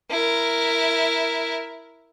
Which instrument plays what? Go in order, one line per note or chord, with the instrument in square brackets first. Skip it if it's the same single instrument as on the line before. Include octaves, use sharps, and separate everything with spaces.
[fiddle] E4 A#4